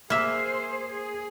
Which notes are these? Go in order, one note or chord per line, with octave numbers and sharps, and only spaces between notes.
A#3 G#4 C5 E5
G#4